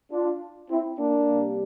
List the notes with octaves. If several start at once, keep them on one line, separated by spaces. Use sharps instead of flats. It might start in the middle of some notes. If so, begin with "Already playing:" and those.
D4 F4
C4 E4
A#3 D4
C3 G3